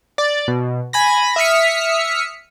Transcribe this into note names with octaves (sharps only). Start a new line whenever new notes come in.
D5
B2
G#5 B5 A#6
E5 D#6 F6 B6 C#7